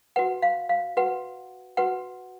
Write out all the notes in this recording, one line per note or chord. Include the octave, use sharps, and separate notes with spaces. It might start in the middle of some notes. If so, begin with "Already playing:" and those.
F#4 B4 F#5
F5
F5
F#4 B4 F#5
F#4 B4 F#5